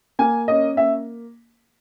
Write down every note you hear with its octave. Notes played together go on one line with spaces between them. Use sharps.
A#3 G#5
C#4 D#5
A#3 E5